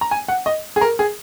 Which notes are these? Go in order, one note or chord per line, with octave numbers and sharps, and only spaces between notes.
A#5
G#5
F#5
D#5
G#4
A#4
G#4